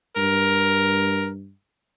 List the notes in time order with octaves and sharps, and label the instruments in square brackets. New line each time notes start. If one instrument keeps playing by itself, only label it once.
[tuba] G2 [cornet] A#4